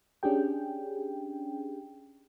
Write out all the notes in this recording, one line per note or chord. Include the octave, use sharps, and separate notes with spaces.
C#4 D4 G4 G#4 G5